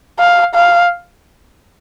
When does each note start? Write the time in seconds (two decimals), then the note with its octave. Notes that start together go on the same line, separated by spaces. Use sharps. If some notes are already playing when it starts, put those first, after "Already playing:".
0.19 F5
0.55 F5